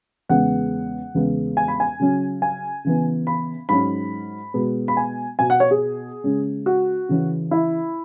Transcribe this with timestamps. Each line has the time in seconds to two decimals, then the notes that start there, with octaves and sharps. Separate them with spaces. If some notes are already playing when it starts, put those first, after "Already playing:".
0.29 E2 C#3 G#3 B3 F#5
1.14 E2 C#3 G#3 B3
1.57 G#5
1.68 B5
1.80 G#5
2.00 C#3 F#3 C#4
2.42 G#5
2.84 C#3 E3 B3
3.27 B5
3.69 G#2 F#3 C#4 B5
4.54 B2 G#3 B3
4.88 B5
4.97 G#5
5.39 B2 B3 G#5
5.50 F#5
5.60 C#5
5.71 G#4
6.24 C#3 G#3 C#4
6.66 F#4
7.09 C#3 E3 C#4
7.51 E4